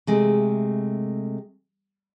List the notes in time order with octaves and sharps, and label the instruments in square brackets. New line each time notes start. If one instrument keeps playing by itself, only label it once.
[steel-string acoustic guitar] C3 G#3 A3